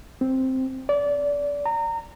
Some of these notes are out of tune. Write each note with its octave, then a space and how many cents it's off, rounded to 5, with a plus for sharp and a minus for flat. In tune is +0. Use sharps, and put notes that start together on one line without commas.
C4 +0
D5 -25
A#5 -25